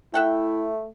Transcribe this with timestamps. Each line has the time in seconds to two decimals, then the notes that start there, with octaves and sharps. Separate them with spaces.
0.14 A3 E4 E5 F#5 G5